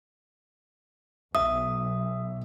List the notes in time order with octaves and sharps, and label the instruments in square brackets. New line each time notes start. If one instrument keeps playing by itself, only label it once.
[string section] B1 [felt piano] E5 [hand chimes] D#6